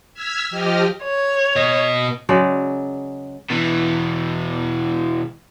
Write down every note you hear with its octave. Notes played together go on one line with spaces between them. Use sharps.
E6 F6 G#6 B6
F3 G4 D#5 F6
C#5
B2 D#5
C#3 F#3 G#3 D5
B2 E3